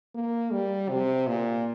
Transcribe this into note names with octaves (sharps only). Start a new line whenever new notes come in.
A#3
G3
C3
A#2